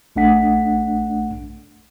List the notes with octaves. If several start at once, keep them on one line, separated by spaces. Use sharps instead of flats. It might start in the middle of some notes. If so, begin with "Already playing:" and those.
A#1 A3 D4 F#5 B6